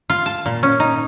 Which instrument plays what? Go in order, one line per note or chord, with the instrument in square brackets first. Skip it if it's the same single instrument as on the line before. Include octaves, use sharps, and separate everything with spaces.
[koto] F4
A5
A#2
C#4
D#4